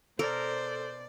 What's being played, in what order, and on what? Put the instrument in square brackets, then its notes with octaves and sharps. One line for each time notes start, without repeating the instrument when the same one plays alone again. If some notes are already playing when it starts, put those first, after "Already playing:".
[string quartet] B2 D5 [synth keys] A4 [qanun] A#4 [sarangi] C5